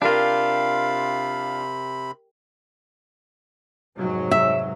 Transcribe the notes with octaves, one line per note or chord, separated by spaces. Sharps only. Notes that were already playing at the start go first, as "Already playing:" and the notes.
C3 D4 F4 G4 A#4 F5 B5
F1 G#2 F#3
E5